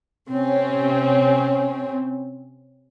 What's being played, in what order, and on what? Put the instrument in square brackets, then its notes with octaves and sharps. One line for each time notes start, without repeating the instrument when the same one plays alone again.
[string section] C3 C4 C#4